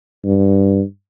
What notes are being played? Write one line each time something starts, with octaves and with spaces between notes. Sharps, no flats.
G2